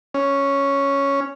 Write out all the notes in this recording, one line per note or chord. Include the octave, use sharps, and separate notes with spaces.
C#4